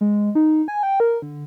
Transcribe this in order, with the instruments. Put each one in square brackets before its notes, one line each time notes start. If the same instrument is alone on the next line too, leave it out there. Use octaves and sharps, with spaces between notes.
[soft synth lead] G#3
D#4
G#5
G5
A#4
D3